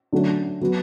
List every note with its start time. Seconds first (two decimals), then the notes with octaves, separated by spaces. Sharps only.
0.13 D3 F#3 A3 C#4
0.61 F#3 B3 F#4